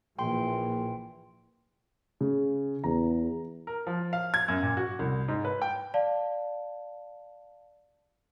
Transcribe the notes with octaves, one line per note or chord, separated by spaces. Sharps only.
A#1 A#2 E3 G5 C6
C#3
E2 A#5
A#4
F3
F5
G#6
F#2
A#2
F#4
C2
G#2
B4
G5
D5 F5 A5